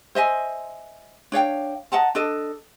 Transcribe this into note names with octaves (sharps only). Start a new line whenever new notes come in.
C5 D#5 E5 G#5
D4 C#5 F5 G5
D#5 F#5 A5 A#5
D4 A4 D#5